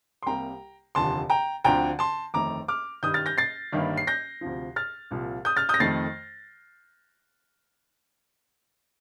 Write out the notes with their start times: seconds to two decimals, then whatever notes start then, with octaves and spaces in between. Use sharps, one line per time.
0.23 C6
0.26 C2 C3 G3 A#3 G5 A#5
0.95 F1 D#2 D3 F3 A5 C6
1.30 G5 A#5
1.64 D2 D3 F3 C4 G5 A#5
1.99 A5 C6
2.34 G1 F2 D#3 A3 A#5 D6
2.68 D6 F6
3.03 G2 D#3 G3 D#6 G6
3.14 F6 A6
3.26 G6 A#6
3.38 A6 C7
3.72 G1 G2 D#3 G3 A#3
3.97 C7
4.07 G6 A#6
4.41 D2 C3 F3
4.76 F6 A6
5.11 C2 A#2 F3
5.45 D#6 G6
5.57 F6 A6
5.69 D#6 G6
5.74 A#6
5.80 F2 D#3 A3 A6 C7